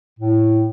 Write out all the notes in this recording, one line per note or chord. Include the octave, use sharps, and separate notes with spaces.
A2